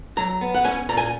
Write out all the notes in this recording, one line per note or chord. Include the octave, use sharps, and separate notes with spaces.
F#3 A#5
B3
F#5
C#4 G#5
A#2 A#5
G#5